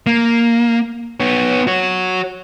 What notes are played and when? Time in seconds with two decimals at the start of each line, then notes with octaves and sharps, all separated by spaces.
0.06 A#3
1.20 B3 C#5
1.67 F#4 C#5